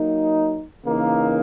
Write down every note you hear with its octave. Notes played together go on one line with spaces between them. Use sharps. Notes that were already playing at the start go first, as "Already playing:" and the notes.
Already playing: F#3 A#3 D#4
C#3 E3 A#3 D#4